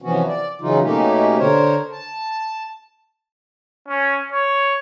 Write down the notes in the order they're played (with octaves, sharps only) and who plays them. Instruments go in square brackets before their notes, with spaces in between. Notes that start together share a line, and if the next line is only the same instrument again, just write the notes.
[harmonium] C3 E3 F3 B3 C#4 F#4
D5
C#3 E3 F#3 D#4 F4
B2 A3 A#3 C#4 D#4 G4
D3 A#4 C5 C#5
A5
[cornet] C#4
C#5